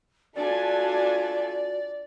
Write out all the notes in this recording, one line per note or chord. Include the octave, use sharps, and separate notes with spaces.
A3 D4 F4 F#4 D5 G#5